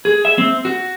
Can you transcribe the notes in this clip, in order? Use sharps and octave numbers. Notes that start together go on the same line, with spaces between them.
G#4
E5
C4
F#4